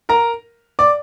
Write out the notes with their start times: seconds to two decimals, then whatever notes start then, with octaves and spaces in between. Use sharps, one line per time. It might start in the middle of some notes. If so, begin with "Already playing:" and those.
0.09 A#4 A#5
0.79 D5 D6